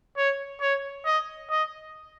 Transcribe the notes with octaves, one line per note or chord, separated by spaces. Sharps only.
C#5
C#5
D#5
D#5